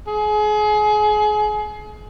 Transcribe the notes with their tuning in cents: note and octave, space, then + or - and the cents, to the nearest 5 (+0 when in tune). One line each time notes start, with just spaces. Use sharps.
G#4 +30